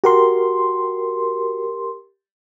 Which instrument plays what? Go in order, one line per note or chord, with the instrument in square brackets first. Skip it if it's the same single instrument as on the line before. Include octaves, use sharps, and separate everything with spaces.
[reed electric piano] F#4 [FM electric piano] G4 A#4 C6